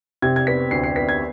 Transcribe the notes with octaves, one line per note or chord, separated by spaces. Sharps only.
C3 G#6
G#6
B3 B6
D2 C7
C7
B3 B6
G#6